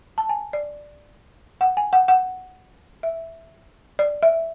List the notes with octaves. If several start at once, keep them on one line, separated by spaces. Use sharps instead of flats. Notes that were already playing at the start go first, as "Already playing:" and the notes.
A5
G#5
D5
F#5
G#5
F#5
F#5
E5
D5
E5